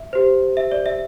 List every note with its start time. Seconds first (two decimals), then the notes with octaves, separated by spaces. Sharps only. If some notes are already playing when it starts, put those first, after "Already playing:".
Already playing: E5
0.13 G4 C5
0.57 E5
0.72 D5
0.86 E5